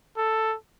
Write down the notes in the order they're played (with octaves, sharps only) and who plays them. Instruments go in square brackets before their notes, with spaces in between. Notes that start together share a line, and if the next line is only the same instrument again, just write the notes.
[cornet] A4